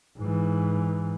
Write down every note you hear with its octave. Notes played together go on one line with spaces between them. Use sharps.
G#2 E3